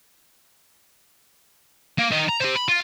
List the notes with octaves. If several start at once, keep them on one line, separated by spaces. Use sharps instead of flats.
A#3
D#3 D#5
A#5
G4 C5
B5
F4